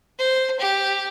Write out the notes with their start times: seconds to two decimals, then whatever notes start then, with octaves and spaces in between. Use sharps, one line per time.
0.19 C5
0.60 G4